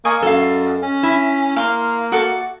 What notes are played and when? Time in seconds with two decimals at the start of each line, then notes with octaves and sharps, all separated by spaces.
0.05 A#3 D#5 G#5 C#6
0.22 F#2 A4 F5
0.82 C#4
1.03 E4
1.56 A#3 F5 C6
2.12 F#4 A4 D6